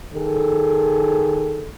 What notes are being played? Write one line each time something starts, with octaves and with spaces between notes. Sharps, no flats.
D#3 G#4 A4